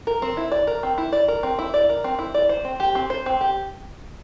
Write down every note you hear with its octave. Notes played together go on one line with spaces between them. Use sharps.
A#4
C4
E4
D5
A#4
C4
E4
D5
A#4
C4
E4
D5
A#4
C4
E4
D5
C5
C4
G4
C4
C5
C4
G4